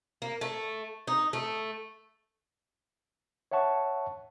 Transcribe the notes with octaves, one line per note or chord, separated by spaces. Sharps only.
A#3
A3
D#4
A3
C#5 E5 F#5 A5 C#6